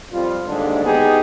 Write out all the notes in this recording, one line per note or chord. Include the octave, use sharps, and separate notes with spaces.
F2 G3 F4
D#2 G#2 D3 D4
B3 D#4 G4 G#4